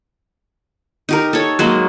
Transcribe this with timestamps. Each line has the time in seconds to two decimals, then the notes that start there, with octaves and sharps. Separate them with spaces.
1.09 D#4 G4 A#4
1.33 A4 C#5
1.59 F#3 G#3 A#3